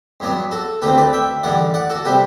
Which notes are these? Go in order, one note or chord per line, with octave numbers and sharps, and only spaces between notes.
G2 F#3 B3 D4
F#4 A4
D2 D3 A3 C4 G4 B4
B4 D5
E5 G5
A1 G2 D3 G3 D5 F#5
D5 F#5
F#4 A4
C3 G3 D4 G4 B4